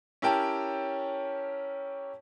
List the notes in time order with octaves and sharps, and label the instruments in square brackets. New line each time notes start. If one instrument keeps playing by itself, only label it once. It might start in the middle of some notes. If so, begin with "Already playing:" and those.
[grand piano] C#4 E4 G4 A#4 G5 A5